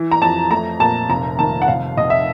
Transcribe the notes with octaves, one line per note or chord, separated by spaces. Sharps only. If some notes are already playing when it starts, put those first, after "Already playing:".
Already playing: E3
A#5
F2 A5
A3 A#5
A#2 A5
F1 A#5
D#3 A5
F#5
F1 F5
F1 D#5
E5